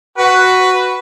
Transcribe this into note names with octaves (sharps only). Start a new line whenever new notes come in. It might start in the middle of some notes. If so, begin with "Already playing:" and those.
F#4 B4